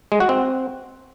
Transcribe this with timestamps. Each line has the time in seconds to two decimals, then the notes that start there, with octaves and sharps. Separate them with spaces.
0.12 G#3
0.20 F#4
0.29 C4